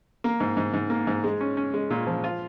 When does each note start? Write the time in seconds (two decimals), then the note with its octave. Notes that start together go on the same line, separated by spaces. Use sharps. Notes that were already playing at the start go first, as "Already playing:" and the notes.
0.24 A#3
0.40 G#2
0.57 G#2
0.74 G#2
0.90 A#3
1.07 G#2
1.24 G#3
1.41 C#4
1.57 C#4
1.74 G#3
1.90 A#2
2.07 F3
2.24 F4